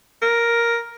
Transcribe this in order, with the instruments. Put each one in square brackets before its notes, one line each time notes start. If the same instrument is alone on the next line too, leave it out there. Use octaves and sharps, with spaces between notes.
[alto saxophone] A#4